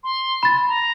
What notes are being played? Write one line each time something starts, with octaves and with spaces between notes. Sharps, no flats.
C6
B5 A6
A#5